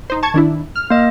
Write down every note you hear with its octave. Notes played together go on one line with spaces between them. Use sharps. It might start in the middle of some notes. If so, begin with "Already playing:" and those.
D#4 C5
A5 C#6 G#6
D#3 D4 E4
F6
A#3 D#5